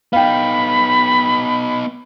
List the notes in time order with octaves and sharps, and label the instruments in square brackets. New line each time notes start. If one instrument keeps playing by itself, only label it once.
[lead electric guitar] B3 D#4 [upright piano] F5 G5 [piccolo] B5